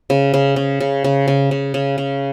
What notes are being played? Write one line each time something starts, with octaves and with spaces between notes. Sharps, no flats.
C#3
C#3
C#3
C#3
C#3
C#3
C#3
C#3
C#3